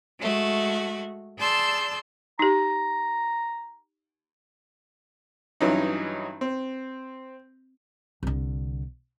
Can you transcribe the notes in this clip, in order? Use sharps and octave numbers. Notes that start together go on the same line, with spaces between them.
G#3 A3 F#4
G#4 D5 A5 C6 E6 G6
D#4 G4 A#5
G2 E3 F#3 C#4 D#4
C4
C2 D3